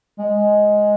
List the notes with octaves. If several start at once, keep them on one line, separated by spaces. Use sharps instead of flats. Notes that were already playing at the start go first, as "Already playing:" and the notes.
G#3